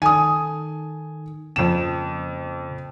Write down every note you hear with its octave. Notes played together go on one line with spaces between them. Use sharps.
D#3 A4 G#5 D#6
F2 A#2 C#3 E7